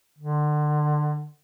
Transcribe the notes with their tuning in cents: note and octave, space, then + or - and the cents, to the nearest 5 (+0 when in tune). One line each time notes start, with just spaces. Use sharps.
D3 +30